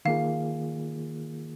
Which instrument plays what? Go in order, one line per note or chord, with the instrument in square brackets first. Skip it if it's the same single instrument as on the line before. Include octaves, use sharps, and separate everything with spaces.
[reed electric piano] D#3 A#3 F4 G#4 [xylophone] F5